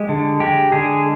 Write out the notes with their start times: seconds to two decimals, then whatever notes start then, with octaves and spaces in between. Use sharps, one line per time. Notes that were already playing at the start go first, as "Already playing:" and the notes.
Already playing: G#3 G4
0.09 D3
0.40 G#3 G4
0.72 D3 G#4